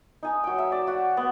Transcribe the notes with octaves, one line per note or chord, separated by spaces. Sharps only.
D#4 G#5 D#6
F#3 G5
E5
D5
F#4 F#5
B3